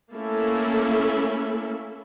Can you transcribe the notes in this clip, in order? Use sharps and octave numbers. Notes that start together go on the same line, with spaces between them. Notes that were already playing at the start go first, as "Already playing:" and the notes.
A3 A#3 C#4 E4 A4